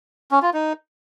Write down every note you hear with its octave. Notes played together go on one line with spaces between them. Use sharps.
C#4
F4
D#4